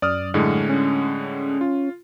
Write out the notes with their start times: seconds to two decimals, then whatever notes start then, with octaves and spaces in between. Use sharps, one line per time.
0.02 F#2 D5 D#6 F6
0.34 A2 D3 G#3
0.69 C#4
1.61 F4